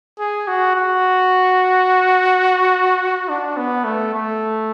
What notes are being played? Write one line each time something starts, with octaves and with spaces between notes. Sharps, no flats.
G#4
F#4
F#4
D4
B3
A3
A3